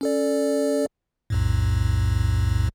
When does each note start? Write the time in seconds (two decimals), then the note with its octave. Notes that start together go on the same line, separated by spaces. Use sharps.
0.01 C#4 A4 D5
1.30 B1 F2 A2